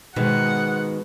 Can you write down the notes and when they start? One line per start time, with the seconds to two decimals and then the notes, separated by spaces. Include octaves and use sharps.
0.16 G#2 B2 D#3 G#3 F#5